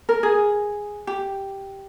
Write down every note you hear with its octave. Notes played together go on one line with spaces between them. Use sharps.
A#4
G#4
G4